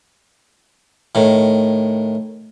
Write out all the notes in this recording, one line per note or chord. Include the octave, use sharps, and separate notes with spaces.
A2 D#3